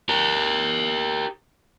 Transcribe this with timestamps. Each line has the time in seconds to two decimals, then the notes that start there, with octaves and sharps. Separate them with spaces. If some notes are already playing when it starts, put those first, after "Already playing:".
0.09 G4 A#4